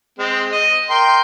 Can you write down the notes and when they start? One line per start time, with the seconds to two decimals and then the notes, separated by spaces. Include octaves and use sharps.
0.19 G#3 C4
0.52 D#5
0.90 A#4 G5 C6